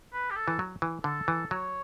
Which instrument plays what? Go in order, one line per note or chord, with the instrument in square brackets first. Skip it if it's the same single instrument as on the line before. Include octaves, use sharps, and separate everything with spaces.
[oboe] B4
G4
A4
[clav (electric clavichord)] E3
F#3
E3
[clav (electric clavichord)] D3 [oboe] A4
[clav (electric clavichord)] E3
[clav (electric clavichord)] F#3 [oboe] C#5